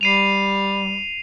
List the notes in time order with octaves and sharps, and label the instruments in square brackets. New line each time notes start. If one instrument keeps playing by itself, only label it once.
[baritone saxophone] G3 [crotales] C7 D#7 F7